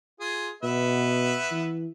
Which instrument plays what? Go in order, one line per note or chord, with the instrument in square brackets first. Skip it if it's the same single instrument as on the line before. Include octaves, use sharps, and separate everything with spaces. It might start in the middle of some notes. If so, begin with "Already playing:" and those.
[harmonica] F4 G#4
[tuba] B2 [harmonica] B3 B4 E5
[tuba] E3